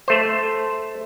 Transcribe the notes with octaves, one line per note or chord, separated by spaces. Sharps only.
A3 C5